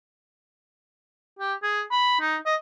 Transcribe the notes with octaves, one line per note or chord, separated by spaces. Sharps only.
G4
G#4
B5
D#4
D#5